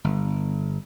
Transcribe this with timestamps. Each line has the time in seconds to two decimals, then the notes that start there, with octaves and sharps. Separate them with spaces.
0.04 G1